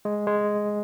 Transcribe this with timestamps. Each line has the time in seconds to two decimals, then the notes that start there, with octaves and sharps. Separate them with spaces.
0.05 G#3
0.27 G#3